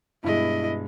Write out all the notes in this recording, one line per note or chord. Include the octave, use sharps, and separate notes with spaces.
G2 B2 G#3 E4 D#5